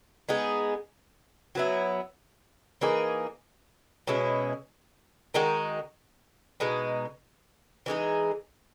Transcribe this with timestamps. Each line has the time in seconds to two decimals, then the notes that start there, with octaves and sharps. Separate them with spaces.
0.29 G#3 B3 D#4 G#4
1.55 F#3 B3 E4
2.81 E3 A#3 D#4 G#4
4.07 B2 G#3 C#4 E4
5.34 D#3 G#3 D#4 F#4
6.60 B2 G#3 D#4
7.86 E3 G#3 D#4 G#4